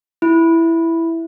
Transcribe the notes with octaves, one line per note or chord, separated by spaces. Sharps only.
E4